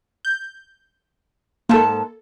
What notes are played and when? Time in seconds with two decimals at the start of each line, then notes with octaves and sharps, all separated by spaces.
0.25 G6
1.69 G#2 A#3 A4 A5